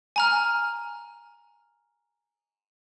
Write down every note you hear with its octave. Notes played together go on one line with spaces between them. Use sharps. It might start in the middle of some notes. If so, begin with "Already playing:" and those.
G#5 A#5 F6